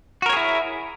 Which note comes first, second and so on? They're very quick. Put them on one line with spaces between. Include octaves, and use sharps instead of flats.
F#4 A#4 C#5 G#4 E4